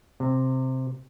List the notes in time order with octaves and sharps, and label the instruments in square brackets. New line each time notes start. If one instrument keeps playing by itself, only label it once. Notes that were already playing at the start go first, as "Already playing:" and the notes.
[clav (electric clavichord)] C3